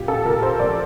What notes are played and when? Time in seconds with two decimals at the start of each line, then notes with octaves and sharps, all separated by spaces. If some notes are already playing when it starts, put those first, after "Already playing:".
Already playing: A#2 G4
0.08 A4
0.25 A#2 A#4
0.43 C5
0.59 F3 D5